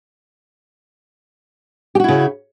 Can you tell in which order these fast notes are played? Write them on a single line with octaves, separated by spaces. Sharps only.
G4 F#4 E4 C#3